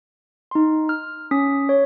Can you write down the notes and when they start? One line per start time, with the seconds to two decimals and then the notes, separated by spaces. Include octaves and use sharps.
0.51 D#4 C6
0.89 F6
1.31 C#4 D#6 B6
1.69 C#5